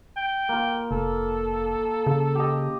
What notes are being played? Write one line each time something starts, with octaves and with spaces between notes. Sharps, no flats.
G5
A#3 F4
F1 A4
C#3
G4 D#5